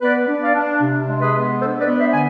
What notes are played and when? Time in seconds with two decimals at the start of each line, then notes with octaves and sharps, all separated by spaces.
0.02 B3 B4 D5
0.28 D4
0.41 D5 F5
0.54 D4
0.81 C3
1.07 G#3
1.20 G#4 B4
1.34 B3
1.60 D4 A4 C5
1.79 B4 D5
1.87 B3
1.99 C5 E5
2.13 D3 G#5